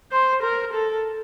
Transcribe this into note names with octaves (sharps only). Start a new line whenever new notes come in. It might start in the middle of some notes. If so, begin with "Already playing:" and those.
C5
A#4
A4